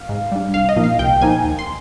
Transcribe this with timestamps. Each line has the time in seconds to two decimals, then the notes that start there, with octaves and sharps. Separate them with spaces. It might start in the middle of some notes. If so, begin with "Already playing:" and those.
Already playing: F5
0.09 G#2
0.32 G3 D4
0.54 C2 F5
0.69 D#5
0.76 A#2 F3 A#3 D#4
0.84 F5
0.99 C2 G5
1.21 A#2 F3 A#3 D#4 G#5
1.44 D#2
1.59 C6